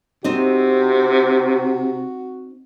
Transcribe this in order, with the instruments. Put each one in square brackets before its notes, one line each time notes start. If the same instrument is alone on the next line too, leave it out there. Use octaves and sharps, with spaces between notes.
[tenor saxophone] C3 [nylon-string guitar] C4 D#4 [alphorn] F#4